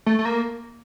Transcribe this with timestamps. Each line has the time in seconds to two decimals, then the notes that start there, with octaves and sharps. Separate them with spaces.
0.06 A3
0.19 A3
0.25 A#3